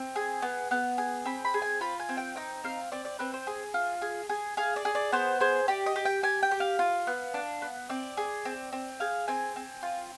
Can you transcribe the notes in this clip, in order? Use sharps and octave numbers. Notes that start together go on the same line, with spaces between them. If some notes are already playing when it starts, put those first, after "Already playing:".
Already playing: C4
G#4
B3
B3
G#4
C4 B5
B5
G#4
G#5
F4 B5
G#5
C4
G5
D#4 G5
C4 F5
C4 D5
D5
C4 B4
C5
G#4
F4
G#4
G#4
G#4 F5
D5
G#4
D5
B3 C5
G#4 C5
G4 D5
D#5
G4
G5
G4 G#5
G5
G4
F5
F4
B3
D4
B3
C4 D5
G#4
C4
C4
G#4 F5
C4 G#5
C4
F4